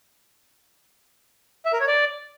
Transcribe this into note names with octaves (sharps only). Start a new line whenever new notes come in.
E5
A#4
C#5
D5